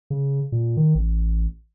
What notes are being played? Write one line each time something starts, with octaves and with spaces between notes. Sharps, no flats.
C#3
A#2
D#3
A1